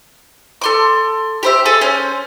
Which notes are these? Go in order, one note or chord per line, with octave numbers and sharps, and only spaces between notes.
A4 C6 D6
G4 C5 E5
G#4 A4
C#4 C5